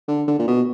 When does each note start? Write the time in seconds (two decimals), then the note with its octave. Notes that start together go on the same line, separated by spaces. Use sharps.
0.08 D3
0.28 D3
0.39 A#2
0.48 B2